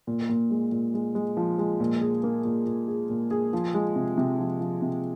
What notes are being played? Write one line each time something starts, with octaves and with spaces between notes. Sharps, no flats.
A#2
A#2
G#3
A#2
G#3
G#3
F3
G#3
A#2
G#4
A#3
A#2
A#2
G#4
A#2
G#4
F3
G#3
C3
C3
F3
F3
C3